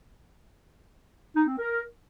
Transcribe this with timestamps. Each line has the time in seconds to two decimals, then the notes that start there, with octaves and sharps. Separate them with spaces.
1.36 D#4
1.47 C4
1.59 A#4